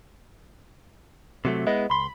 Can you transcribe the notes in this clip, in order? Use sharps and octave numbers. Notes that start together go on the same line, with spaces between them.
C3 F#3 A3
G#3 B3 E4 D#5
C#2 B5 C6